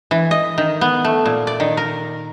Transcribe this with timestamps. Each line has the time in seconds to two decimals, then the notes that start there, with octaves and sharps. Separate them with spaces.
0.11 E3
0.31 D#5
0.58 D#3
0.81 B3
1.05 A3
1.26 A#2
1.47 D5
1.60 D#3
1.77 A#4